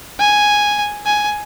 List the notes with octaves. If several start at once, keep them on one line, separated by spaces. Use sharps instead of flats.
G#5
G#5